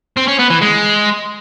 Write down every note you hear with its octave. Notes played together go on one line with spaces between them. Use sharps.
C4
C#4
B3
E3
G#3